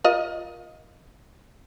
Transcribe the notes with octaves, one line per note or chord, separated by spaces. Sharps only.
F4 A#4 D#5